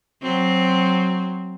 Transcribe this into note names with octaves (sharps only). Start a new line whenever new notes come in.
F#3 C4